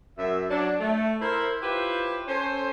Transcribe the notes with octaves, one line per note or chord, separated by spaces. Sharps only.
F#2 E5
F#3 D4
A3
E4 A#4 C5
E4 F4 G4 B4 C5
C#4 A4 C5